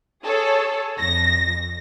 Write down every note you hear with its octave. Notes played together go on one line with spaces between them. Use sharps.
G#4 A4 C#5
F2 A#6